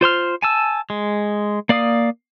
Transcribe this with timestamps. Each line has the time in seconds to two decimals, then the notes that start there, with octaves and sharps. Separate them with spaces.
0.01 F4 C5 C6 F6
0.42 G#5 A5 E6
0.90 G#3
1.69 A#3 D5 F5 D#6